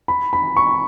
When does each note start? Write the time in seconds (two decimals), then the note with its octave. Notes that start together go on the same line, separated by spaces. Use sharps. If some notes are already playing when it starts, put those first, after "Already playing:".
0.08 B5
0.33 B5
0.57 C#6